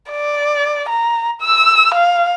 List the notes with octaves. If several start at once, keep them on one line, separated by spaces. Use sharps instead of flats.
D5
A#5
E6
F5